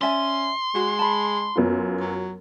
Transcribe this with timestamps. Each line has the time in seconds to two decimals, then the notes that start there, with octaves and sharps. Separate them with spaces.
0.01 C#4 D5 E5 G#5 C6
0.75 G#3 F#4
0.99 A5 B5
1.56 F#2 B3 F4
2.00 F#3